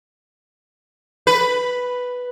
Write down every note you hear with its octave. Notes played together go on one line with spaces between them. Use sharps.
B4